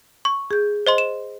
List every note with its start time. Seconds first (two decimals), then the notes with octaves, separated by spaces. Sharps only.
0.25 C#6
0.51 G#4 G6
0.87 C5 D#5 C6
0.98 E7